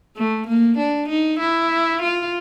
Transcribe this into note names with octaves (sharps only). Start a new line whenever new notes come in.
A3
A#3
D4
D#4
E4
F4